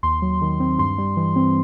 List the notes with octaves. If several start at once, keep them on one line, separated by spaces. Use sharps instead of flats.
D#2 C6
F#3
D#3
C4
G2 C6
G3
E3
C4